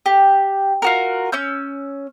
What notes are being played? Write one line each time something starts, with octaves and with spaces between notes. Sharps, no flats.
G4
F4 F#4 A#4
C#4 E6 G6